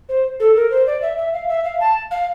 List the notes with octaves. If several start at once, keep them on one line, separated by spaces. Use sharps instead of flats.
C5
A4
A#4
C5
D5
E5
E5
F5
E5
F5
A5
F5